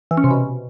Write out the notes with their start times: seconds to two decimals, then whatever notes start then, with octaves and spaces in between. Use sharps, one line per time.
0.11 E3
0.17 C#4
0.24 C3
0.31 B2